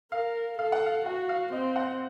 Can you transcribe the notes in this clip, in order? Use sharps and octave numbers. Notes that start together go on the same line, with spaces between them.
A#4 F5
A4 F5
F#5
F5
F#4 F#5
F5
C4 D#5
F#5